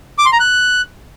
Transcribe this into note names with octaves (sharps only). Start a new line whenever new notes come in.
D6
C6
A#5
F#6